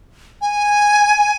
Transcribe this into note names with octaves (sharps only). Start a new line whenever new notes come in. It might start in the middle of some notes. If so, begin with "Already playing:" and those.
G#5